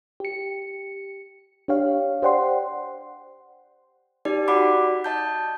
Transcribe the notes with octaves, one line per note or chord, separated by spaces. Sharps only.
G4 C#7
D4 G4 C#5 F5
G4 C5 D5 F#5 G5 C6
D#4 G4 D5
F#4 D5 F#5 B5 D6
D#5 A5 G6